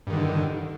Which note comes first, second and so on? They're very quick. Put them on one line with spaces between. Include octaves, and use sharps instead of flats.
G2 D#3 D3